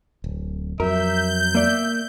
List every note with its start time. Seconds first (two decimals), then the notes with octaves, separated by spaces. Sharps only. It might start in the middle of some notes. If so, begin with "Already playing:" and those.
0.24 D1
0.80 F2 F#3 A#4 E5 G6
1.55 A#3 D5 E5